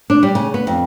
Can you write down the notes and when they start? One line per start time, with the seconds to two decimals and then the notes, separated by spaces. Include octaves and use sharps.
0.10 D4
0.23 G3
0.35 C#3
0.54 B3
0.67 F2